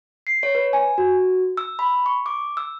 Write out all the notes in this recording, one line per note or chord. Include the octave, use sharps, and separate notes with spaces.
C7
C#5
B4
G#5
F#4
E6
B5
C#6
D6
E6